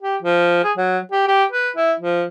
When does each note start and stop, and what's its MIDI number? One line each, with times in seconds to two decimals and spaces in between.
0.02 0.17 67
0.22 0.61 53
0.64 0.72 68
0.77 0.98 54
1.11 1.25 67
1.27 1.44 67
1.52 1.70 71
1.76 1.93 64
2.00 2.24 53